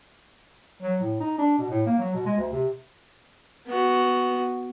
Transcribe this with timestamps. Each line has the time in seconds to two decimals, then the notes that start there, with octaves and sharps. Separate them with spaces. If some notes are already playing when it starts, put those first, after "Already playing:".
0.82 F#3
1.01 A2
1.20 D#4
1.38 D4
1.58 B2
1.70 A2
1.86 A#3
1.98 F#3
2.14 B2
2.26 G#3
2.38 D2
2.52 C3
3.67 B3 F#4